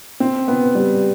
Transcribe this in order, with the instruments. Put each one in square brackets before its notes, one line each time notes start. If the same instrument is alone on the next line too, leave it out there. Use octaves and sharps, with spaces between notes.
[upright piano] C4
B3
G3